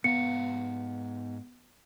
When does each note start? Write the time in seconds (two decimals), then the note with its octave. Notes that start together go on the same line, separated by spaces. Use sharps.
0.04 G#2 B3 F5 A#5 C#7